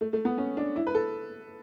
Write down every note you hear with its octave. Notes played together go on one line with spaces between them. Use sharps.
A3
A3
B3
C#4
D4
E4
B4
A4